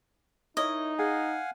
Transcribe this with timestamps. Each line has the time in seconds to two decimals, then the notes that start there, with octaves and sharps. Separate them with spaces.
0.57 D#4 E4 A#4 C#5 D#5
0.99 G#4 F5 F#5 G#5